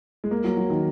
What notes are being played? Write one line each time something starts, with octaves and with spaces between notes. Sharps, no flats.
G#3
A#3
F#3
F#3
D#3